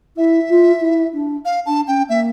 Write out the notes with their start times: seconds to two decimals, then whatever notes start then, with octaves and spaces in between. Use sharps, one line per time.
0.17 E4 E5
0.49 F4
0.81 E4
1.14 D4
1.45 F5
1.66 D4 A5
1.88 C#4 G5
2.09 A#3 E5